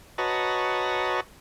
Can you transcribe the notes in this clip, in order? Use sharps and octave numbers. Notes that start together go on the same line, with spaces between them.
F#4 B4 C#5 D#5 A5 A#5